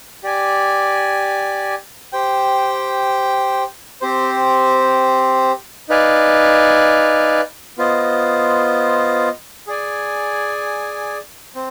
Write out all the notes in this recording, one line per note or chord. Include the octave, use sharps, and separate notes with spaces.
G4 D5 G#5
G4 C5 G5
C4 G4 C5
D#4 B4 D5 F5 G#5
B3 F4 C5 D#5
G#4 D5 G#5
C4